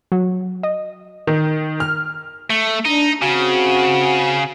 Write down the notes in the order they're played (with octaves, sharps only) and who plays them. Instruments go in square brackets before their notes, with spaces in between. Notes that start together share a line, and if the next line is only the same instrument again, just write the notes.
[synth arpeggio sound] F#3
D#5
[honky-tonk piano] D#3
F6
[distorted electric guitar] A3
[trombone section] D4 [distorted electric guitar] D#4
[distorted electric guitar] C#3 [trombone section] C4 F#4